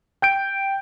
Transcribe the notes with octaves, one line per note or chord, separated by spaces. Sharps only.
G5 G6 D7